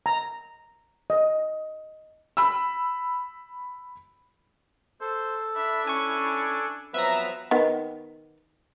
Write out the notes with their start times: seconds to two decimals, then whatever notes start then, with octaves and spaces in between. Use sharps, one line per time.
0.06 A#5
1.10 D#5
2.37 B5 E6
5.01 A4 C5
5.56 D4 E5 B5
5.87 C#4 E4 G#5 C#6
6.94 F3 F#3 B3 C4 B4 E5 A#5
7.51 D#3 B3